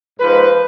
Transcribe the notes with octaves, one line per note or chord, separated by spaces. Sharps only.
G#2 F3 A#3 D#4 B4